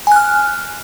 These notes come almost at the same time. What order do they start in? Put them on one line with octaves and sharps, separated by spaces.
G#5 F#6 F6